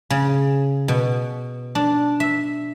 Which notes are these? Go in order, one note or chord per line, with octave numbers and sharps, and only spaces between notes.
C#3
B2
D4
E5